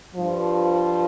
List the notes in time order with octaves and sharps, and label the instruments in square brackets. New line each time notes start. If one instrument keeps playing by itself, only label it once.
[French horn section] G2 F3